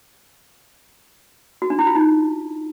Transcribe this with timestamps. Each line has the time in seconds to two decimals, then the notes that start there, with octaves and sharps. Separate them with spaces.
1.62 F#4
1.70 D4
1.79 E4
1.87 F4
1.95 D#4